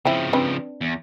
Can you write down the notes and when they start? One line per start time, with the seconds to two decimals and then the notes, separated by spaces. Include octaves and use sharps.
0.05 C#3 F3 C4 E4
0.33 C4 D4 B4
0.81 E2